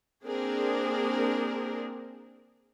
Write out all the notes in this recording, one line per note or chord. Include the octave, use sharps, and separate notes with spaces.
A#3 C4 D4 G#4 A#4